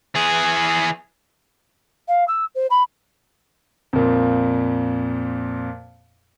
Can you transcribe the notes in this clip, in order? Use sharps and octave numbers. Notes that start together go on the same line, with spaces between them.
E3 G#4
F5
E6
C5
B5
F2 A#2